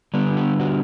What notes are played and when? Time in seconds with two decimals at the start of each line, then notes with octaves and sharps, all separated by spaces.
0.14 D3 G3 B3 D4
0.37 G4
0.59 F#4